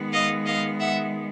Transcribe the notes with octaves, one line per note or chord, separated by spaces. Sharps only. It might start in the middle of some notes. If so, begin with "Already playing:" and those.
Already playing: D#3 G#3 B3
D#5 F5
D#5 F5
E5 F#5